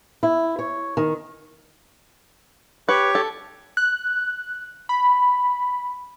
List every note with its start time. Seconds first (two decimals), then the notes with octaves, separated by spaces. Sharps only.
0.23 E4
0.59 C#5
0.97 D#3
2.89 G4 B4 C#5 C#6
3.15 A4
3.77 F#6
4.89 B5